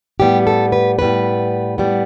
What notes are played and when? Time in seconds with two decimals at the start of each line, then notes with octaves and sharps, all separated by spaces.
0.20 A2 G3 B3 G4
0.47 A4
0.72 B4
0.99 A2 G3 B3 B4
1.78 A2 G3 B3